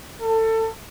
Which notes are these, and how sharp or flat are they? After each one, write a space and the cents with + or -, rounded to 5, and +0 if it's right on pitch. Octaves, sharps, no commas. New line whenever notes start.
A4 +25